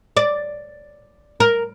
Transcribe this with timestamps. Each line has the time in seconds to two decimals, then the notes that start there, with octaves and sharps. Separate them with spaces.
0.17 D5
1.40 A#4